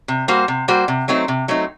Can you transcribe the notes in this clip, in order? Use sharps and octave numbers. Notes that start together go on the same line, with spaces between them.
C3
G3 A#3 F#4 C5
C3
G3 A#3 F#4 C5
C3
F#3 A3 C4 D#4
C3
F#3 A3 C4 D#4